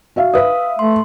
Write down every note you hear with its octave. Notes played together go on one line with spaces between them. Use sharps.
F#4 E5 F5
B4 E5 F5 D#6
A3 C6